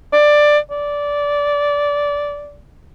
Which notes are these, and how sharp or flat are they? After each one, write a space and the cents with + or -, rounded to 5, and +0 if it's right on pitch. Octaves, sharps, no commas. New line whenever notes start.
D5 +10
D5 -15